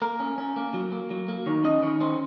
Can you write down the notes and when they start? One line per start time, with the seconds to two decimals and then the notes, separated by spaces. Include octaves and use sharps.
0.02 A#3 A#4
0.20 C#4
0.38 C#4
0.56 A#3
0.74 F#3
0.92 A#3
1.10 F#3
1.28 A#3
1.46 D#3 C#5
1.64 C#4 D#5
1.82 D#3 C#5
2.00 C#4 C5